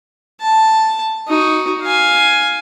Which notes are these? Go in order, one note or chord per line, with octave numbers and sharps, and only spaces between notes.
A5
D#4 F#4
F5 G#5